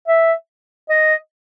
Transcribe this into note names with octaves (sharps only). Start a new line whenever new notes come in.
E5
D#5